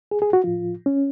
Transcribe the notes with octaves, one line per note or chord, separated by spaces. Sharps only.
G#4
G#4
F#4
A2 F3 F4
C#4